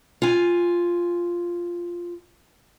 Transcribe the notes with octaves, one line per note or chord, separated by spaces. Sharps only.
F4 G#5